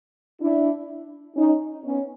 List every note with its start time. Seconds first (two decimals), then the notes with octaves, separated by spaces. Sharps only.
0.40 D4 E4
1.36 C#4 D#4
1.84 B3 C#4